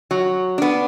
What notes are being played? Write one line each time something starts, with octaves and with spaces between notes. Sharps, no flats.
F#3
B3 D4